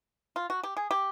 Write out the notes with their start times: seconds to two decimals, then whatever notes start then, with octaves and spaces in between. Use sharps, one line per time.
0.36 F4
0.50 F#4
0.63 G4
0.77 G#4
0.91 G4